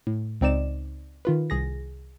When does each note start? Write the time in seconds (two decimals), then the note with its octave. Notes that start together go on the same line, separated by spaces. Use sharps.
0.07 A2
0.41 C#2 C4 D#4 D5 E7
1.25 D#3 F4 B4
1.50 C2 G#4 A#6